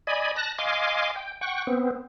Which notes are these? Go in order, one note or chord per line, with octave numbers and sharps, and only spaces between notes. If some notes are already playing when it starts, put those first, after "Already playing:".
D5 D#5 G#5 B5
A5 F#6 A#6
D#5 F5 G#5 C6 D6
G5
F#5 G5 C#6
B3 C4